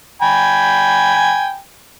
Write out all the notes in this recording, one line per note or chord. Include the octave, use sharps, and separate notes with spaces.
G5 G#5 B5